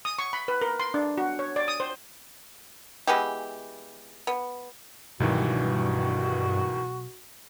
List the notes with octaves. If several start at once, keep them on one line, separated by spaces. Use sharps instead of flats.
D#6
C#6
B5
B4
A#4
C6
D4
F#4
C#5
D5
D#6
C5
E3 G#3 B3 G4
B3
C#2 G2 B2 D#3 E3 F#3 F#4